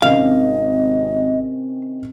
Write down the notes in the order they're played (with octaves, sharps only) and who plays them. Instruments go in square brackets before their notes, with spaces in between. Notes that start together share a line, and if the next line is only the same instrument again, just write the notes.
[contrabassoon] G#1 [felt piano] C3 D#3 C#4 [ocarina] D#5 [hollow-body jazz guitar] F5